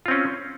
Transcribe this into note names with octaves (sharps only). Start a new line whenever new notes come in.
C4 C#4 F4